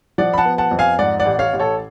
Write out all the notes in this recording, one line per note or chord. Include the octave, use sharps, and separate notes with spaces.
F3 D5 F#5
B5
F#5 A5
B3
F#5 A5
F2
F5 G#5
G#2 D5 F#5
D5 F#5
A1
C#5 F5
A1
A4 C#5